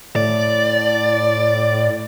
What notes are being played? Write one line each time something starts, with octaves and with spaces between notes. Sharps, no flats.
A2 D5